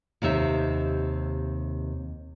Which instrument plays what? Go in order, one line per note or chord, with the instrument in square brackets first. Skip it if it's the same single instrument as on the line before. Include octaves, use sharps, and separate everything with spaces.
[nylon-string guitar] D#2 C3 D#4 E5